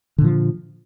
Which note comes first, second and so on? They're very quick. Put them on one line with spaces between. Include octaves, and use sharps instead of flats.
D3 A#2 F3